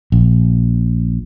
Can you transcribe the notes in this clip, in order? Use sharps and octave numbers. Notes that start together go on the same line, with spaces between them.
A#1